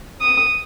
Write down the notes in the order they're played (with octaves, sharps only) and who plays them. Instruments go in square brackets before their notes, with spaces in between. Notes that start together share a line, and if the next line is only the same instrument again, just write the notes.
[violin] D#6